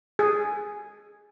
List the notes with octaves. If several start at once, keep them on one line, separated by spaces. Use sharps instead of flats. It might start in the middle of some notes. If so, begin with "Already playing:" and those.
G#4